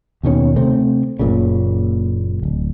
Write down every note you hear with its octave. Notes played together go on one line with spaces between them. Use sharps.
D#2 B2 D#3 C#4
C3 A3 C4
F#1 A#2 C#3
D1